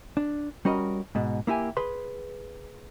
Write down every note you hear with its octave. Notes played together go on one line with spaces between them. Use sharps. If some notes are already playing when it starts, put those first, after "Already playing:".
D4
G3 C#4 F#4 A#4 D#5
G#2 B2
A#3 E4 G4 G#5
G#4 B4 C6